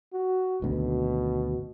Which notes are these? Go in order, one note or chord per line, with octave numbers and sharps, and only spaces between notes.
F#4
G#1 D2 B2